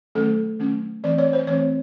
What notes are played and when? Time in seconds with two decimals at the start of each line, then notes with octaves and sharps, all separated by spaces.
0.15 D#3 F#3 A3 C#4 A4
0.59 D#3 F#3 A3 C#4
1.04 E3 A3 C4 D5
1.18 C#5
1.33 C5
1.47 E3 A3 C4 C#5